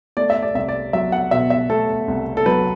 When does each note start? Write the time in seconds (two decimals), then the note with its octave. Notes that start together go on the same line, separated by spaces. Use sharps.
0.17 A3 D5
0.30 E5
0.42 D5
0.54 C2 E5
0.68 D5
0.93 F#3 E5
1.12 F#5
1.31 B2 E5
1.50 E5
1.70 A3 A4
2.08 C2
2.37 A4
2.46 F#3 B4